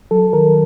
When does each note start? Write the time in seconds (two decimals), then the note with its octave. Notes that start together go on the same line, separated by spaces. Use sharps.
0.11 F#3 A4
0.33 D#3 A#4